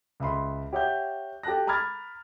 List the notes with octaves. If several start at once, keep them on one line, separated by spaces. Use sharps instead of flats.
C#2 E5 B5 C6
G4 C#5 E5 F#5 G6
G4 A4 A5 F#6 A#6
A#5 B5 D6 F6 G#6 A6